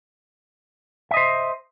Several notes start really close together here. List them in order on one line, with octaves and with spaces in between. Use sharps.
E5 D#5 C5